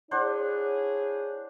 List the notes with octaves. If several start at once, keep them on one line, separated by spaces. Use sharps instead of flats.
D4 E4 G#4 C5 C#5 F#5